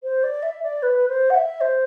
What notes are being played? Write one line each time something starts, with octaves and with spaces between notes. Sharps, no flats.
C5
D5
E5
D5
B4
C5
F#5
E5
C5